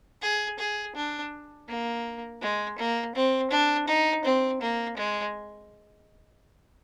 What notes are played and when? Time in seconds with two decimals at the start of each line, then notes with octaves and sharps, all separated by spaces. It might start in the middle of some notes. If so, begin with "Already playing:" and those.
0.22 G#4
0.59 G#4
0.95 D4
1.68 A#3
2.41 G#3
2.78 A#3
3.15 C4
3.51 D4
3.88 D#4
4.25 C4
4.61 A#3
4.97 G#3